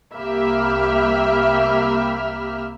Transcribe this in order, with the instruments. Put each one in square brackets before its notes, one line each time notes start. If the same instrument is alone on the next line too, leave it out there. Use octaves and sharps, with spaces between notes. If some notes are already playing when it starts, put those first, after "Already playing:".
[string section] C2 A#3 G4 E5 B5 F6